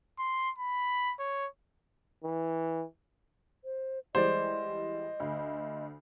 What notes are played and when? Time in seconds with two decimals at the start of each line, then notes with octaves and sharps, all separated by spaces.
0.19 C6
0.58 B5
1.19 C#5
2.23 E3
3.64 C5
4.15 E3 G3 G#3 C5 D5 D#5
5.20 D2